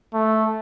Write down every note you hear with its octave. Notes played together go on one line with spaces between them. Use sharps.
A3